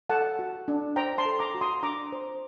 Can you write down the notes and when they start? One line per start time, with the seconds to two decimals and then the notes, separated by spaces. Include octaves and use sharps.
0.09 A4 F#5 A5
0.39 F#4
0.68 D4
0.96 C5 G5 A#5
1.18 A5 C6
1.25 A4
1.39 A#5 D6
1.55 F#4
1.61 C6 D#6
1.83 D4 A#5 D6
2.12 C5